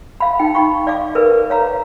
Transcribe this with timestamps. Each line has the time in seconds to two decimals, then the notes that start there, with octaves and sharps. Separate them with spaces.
0.20 F5 B5
0.39 D#4 G5
0.55 D#4 B5 C#6
0.87 D5 F5 D6
1.15 A#4 B4
1.50 C#5 F5 A#5